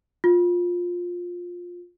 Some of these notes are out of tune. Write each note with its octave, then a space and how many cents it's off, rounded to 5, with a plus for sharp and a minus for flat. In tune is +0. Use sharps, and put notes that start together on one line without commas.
F4 +15